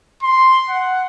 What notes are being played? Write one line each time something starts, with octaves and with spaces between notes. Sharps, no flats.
C6
F#5